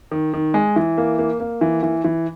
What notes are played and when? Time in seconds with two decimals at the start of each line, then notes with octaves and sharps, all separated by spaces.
0.12 D#3
0.34 D#3
0.54 G#3
0.76 E3
0.98 A#3
1.19 A#3
1.40 A#3
1.61 E3
1.83 E3
2.04 E3